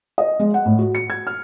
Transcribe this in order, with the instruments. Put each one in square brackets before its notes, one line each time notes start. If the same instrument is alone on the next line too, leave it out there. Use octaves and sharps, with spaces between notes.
[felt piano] D#5
G#3
F#5
A2
F#4
C#7
G#6
F6